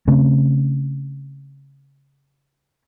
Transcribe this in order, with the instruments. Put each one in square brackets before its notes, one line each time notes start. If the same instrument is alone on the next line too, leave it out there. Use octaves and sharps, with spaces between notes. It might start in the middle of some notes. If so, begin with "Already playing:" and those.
[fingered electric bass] C#3 A3 C4 C#4